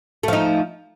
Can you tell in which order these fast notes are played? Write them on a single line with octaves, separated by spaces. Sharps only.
A3 F3 D#4